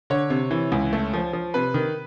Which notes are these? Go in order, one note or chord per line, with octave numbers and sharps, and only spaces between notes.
D3 C#5
C3
E3
C#2
A3
F3
F3
C3 B4
D#3